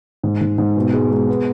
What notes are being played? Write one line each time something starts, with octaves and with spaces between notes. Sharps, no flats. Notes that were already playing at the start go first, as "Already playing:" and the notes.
G#2
G#2
G#2
B2
G#3
G#3
B3